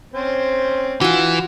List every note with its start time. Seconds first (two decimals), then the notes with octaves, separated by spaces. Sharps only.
0.14 C4 C#4 C5
1.01 E3 F4 F#4